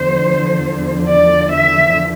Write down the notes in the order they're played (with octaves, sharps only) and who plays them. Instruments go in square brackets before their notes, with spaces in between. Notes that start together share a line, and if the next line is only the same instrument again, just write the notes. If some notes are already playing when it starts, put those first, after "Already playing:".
Already playing: [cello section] E2 D3 F3 C5
D5
E5